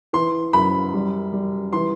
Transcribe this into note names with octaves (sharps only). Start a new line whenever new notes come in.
E3 C6
F#2 B5
G3
G3
E3 C6